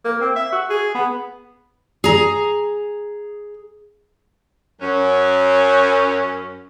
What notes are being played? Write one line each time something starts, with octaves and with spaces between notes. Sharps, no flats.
A#3
C4
E5
F#4
G#4
B3
G#4 A#5
F#2 C#4